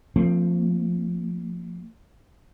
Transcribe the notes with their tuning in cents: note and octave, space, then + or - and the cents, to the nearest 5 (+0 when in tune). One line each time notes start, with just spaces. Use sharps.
F3 +0 A3 +45 C4 +0